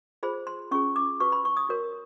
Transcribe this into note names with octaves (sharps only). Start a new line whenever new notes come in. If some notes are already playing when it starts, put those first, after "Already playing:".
F4 G#4 C5 B5
C6
C#4 F4 G#4 C#6
D6
F#4 B4 C#6
B5
C#6
D#6
F#4 A#4 C#5